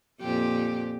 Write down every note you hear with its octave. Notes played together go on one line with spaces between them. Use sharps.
F2 A#2 G4